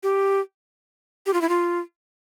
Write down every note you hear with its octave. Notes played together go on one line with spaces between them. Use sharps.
G4
G4
F4
E4
F4